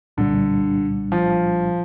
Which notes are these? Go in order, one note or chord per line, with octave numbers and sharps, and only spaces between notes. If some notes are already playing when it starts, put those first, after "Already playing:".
C2 A#2 D3 G3 D4
F3